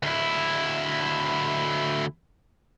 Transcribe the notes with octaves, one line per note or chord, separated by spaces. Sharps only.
D2 E4